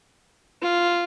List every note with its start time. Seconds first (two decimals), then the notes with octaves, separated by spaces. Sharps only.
0.62 F4